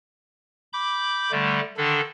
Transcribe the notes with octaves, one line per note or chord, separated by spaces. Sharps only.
B5 D6 G6
D3 G3 A3
D3 D#3 D4 A4